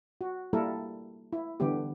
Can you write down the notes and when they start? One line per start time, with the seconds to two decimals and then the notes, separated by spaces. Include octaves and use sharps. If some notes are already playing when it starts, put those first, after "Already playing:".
0.21 F#4
0.53 G3 A#3 E4 A4 A#4
1.33 E4
1.60 D3 E3 G3 B3 G4